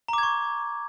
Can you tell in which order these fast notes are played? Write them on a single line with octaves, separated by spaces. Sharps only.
A#5 D6 G#6 C#6